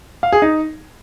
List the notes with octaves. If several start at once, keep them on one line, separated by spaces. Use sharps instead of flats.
F5
G#4
D#4